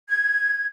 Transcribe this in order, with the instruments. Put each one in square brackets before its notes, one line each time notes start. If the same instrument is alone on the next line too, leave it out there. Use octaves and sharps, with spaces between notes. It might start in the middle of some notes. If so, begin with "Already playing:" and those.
[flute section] G#6